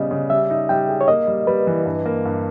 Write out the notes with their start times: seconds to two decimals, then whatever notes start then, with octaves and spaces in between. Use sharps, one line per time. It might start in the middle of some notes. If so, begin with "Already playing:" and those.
Already playing: C#3 G3 B3 D#5
0.11 C#3
0.30 G3 E5
0.50 D#4
0.69 G3 G5
0.89 G#4
1.01 C#5
1.08 A#3 D#5
1.27 G3
1.47 G3 B4
1.67 E3
1.86 G2
2.06 A#3
2.25 G2